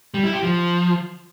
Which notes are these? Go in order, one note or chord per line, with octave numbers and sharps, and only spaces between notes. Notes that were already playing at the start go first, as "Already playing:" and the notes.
G3
E4
G4
F3